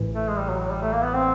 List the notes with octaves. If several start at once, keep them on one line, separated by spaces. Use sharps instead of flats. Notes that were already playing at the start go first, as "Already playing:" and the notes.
Already playing: A1 A2 E3
A3
G#3
G3
F#3
F#3
G3
A3
A#3
B3
C4